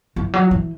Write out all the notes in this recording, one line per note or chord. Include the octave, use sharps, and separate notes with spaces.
E3
F#3
E3